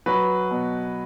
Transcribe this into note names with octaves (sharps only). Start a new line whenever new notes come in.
F#3 B4
B2